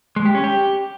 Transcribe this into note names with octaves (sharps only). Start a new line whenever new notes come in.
G#3
G4
C#4
G4